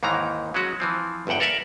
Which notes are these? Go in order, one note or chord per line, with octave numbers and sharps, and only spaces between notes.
D#2 G#2 D#3 E3 A#5
F#3 G#3 C#4 F#4
E3 F3 C4
G1 E2 G2 F#5 G5
A4 A#4 D5 E5 F#5